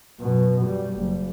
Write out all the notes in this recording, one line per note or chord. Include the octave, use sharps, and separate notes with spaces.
F#2 B2
G3
F#1